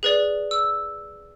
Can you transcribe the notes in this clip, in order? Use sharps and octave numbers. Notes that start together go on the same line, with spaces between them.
G#4 B4 D5
E6